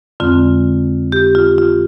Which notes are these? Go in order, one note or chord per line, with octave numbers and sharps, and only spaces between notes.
F2 D3 G#3 C4 F4
G4
F4
F4